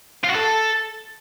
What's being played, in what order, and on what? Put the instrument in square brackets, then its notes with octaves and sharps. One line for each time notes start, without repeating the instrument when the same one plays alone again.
[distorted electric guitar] F4
F#4
A4